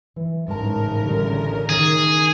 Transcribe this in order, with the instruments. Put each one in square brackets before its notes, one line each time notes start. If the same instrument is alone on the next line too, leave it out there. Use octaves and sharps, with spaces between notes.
[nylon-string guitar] E3
[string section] A1 C#3 A#4 [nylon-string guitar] G#2 A5
[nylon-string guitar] D3 G3
[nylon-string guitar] D#3 [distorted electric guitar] G#4